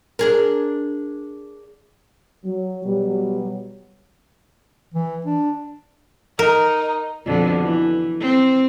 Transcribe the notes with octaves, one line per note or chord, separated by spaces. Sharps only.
D4 G#4 A#4
F#3
B2 F#3 G3
E3
D4
D#4 A#4
F2 B2 D3
E3
C4